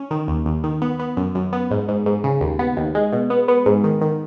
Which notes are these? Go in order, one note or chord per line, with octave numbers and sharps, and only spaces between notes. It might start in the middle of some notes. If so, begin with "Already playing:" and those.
Already playing: C#4
D#3
D#2
D#2
D#3
B3
B3
F#2
F#2
B3
G#2
G#2
G#2
C#3
D#2
B3
D#2
G#3
B2
B3
B3
G#2
D#3
D#3